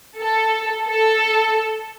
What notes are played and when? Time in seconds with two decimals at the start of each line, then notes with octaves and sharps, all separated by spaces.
0.20 A4
0.87 A4